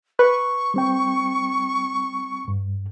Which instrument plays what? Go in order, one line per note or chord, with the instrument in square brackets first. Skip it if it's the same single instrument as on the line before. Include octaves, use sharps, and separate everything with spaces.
[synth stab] B4 [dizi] C#6
[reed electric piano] G3 C4 G5
G2